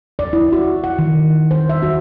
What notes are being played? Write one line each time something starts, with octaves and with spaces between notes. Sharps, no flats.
D5
E4
F#4
F#5
D#3
C5
E5
F#4